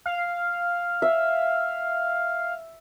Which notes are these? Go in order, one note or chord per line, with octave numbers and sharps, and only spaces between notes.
F5
E5